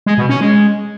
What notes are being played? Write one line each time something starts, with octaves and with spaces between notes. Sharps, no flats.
G#3
B2
C#4
G#3